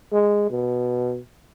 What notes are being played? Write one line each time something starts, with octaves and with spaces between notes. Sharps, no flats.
G#3
B2